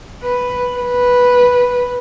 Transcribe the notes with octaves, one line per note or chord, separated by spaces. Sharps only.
B4
B4